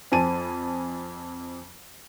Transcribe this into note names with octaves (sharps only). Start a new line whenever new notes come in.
F2 C5 G#5 A5 D#7